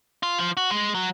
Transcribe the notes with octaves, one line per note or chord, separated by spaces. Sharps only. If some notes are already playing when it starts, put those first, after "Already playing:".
F4
F3
F#4
G#3
F#3